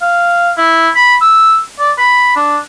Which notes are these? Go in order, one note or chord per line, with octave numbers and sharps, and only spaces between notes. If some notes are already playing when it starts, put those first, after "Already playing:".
F5
E4
B5
E6
D5
B5
D4